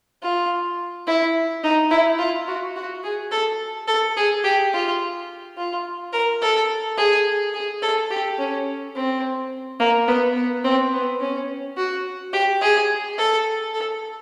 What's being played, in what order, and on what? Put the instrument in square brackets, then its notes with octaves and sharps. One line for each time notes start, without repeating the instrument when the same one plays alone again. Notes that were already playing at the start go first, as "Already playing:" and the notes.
[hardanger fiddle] F4
E4
D#4
E4
F4
F#4
F#4
G#4
A4
A4
G#4
G4
F4
F4
A#4
A4
G#4
G#4
A4
G4
C#4
C4
A#3
B3
B3
C4
B3
C#4
F#4
G4
G#4
A4
A4